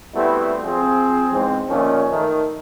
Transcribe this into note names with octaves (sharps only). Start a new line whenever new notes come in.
G3 A3 B3 C4 E4 F#4
F3 C4 G#4
E2 G#2 C4
A#2 D#3 F3 A3 C#4
D#3 A3